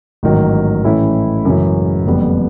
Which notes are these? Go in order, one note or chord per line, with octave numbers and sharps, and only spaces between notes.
A1 G#2 D#3 F#3
A2 E3 A3 C#4 E4
F#2 C#3 E3 G#3 C#4
F#1 F2 D3 G3 B3